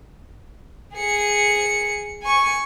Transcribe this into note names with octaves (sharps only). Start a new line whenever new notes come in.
G#4 C#7
G#5 C#6